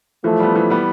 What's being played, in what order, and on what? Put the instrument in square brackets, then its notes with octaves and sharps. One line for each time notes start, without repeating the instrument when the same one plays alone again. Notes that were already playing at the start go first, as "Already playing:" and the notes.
[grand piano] E3 [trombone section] F3 A3
[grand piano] G3 B3
E3
G3 B3